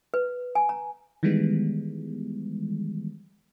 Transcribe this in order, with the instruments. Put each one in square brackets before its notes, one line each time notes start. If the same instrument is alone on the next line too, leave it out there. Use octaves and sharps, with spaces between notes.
[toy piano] B4
G#5
A#5
[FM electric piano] D#3 E3 G3 G#3 B3